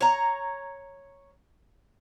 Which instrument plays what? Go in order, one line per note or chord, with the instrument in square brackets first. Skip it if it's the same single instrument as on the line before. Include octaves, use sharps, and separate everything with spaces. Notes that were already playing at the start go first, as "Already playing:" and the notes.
[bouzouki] C#5 A#5